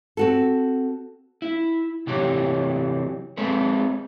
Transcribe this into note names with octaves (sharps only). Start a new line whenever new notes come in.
C4 F#4 A4
E4
C3 E3 F#3 G4
G#3 C4 A4 B4